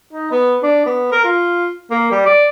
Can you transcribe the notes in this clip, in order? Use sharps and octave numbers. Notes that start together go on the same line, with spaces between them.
D#4
B3
D4
B3
A#4
F4
A#3
G3
D5